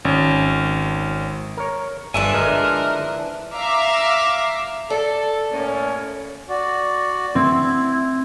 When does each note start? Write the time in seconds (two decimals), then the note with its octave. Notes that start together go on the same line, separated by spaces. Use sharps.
0.05 G#1 C#4
1.57 A#4 C#5
2.14 G1 E3 F3 D4 E5 G#5
2.33 D3 G#3 A#4
3.55 E5 F5 A#5 D6
4.90 A4 D5
5.52 A2 A#3 C#4
6.49 F#4 D5
7.35 C4 E4